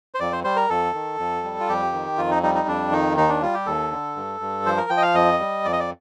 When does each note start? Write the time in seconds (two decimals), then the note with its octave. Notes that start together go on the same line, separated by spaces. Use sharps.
0.15 C5
0.20 F2 D5
0.33 C5
0.44 G3 C5
0.56 A#4
0.69 F2 A4
0.94 D#3
1.19 F2
1.44 G3
1.60 F4
1.68 F2 G4
1.93 D#3
2.18 F2 F4
2.31 D#4
2.43 G3 D#4
2.55 D#4
2.67 F2 D4
2.92 D#3 D#4
3.16 D#2 D#4
3.29 D4
3.42 G3 F4
3.54 G4
3.66 D#2 A4
3.91 D3
4.16 G2
4.40 G2
4.66 F3 C5
4.77 A#4
4.90 F3 G5
4.97 D#5
5.03 F5
5.14 F2 D#5
5.40 G3
5.65 F2 D5
5.72 D#5
5.80 D5